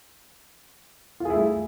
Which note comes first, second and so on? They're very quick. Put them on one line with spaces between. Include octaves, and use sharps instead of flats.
F4 G#4 E4 A3